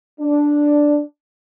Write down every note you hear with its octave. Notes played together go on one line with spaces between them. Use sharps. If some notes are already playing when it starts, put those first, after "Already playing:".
D4